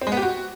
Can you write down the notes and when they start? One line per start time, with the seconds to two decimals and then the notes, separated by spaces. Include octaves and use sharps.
0.01 C4
0.07 G#3
0.12 B3
0.17 G4
0.22 F#4